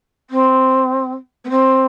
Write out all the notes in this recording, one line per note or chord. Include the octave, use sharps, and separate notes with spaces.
C4
B3
C4